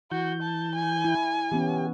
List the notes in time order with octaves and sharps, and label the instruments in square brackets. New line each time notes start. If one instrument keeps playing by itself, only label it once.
[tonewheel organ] E3 G6 [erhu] F#4
[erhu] A5
G#5
[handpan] E4
[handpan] E3 B3 C#4 [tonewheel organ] G4